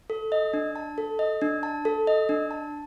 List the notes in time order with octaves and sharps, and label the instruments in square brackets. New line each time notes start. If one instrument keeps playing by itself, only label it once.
[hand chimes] A4
D#5
D4
A5
A4
D#5
D4
A5
A4
D#5
D4
A5